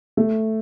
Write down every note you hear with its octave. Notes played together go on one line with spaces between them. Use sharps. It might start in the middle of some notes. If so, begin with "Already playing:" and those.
A3